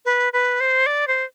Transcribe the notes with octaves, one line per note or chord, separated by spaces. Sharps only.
B4
B4
C5
D5
C5